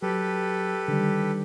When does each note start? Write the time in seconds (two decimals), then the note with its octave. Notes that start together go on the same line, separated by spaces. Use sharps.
0.03 F#3 G4 A4 B4
0.88 D3 D#3 G3